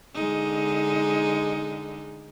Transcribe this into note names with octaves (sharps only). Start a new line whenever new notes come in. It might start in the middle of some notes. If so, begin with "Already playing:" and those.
D3 G#3 D#4